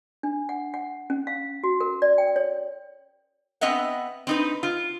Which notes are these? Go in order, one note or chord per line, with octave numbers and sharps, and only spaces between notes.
D4
F#5
F#5
C#4
F5
F#4
A#4
D5
G5
C#5
B3 C4 D#5 E5 F#5
C4 D#4 B4
F4